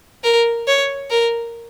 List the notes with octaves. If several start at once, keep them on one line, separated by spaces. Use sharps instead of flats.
A#4
C#5
A#4